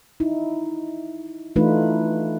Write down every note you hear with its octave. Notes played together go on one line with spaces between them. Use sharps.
D#4 E4
E3 A3 D4 D#4 F4 B4